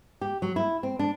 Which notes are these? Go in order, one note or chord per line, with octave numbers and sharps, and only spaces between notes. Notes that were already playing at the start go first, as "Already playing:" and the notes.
G4
F#3
E4
C4
D4